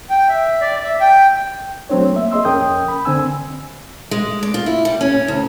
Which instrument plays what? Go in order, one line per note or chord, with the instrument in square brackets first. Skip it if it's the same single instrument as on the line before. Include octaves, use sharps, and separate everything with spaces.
[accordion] G5
E5
D5
E5
G5
[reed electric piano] F#3 A3 C4 D4 C#5
A#3 E5
G#4 D#5 C6 E6
F2 C#4 A#4 G5 D#6 G6
B5
D3 C4 G#5 E6
[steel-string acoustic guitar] G#3
D5
F4
E4
G3
C#4
D2